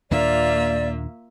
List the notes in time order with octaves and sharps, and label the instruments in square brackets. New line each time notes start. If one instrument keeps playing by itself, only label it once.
[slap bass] D#2 A#2 D4 [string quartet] A#3 F4 E5 [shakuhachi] D5